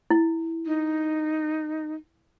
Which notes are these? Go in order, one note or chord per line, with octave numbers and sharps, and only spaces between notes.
E4
D#4